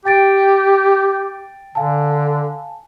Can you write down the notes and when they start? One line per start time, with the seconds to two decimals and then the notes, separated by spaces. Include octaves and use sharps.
0.05 G4 G5 A6 D7
1.75 D3 F5 G#5 A5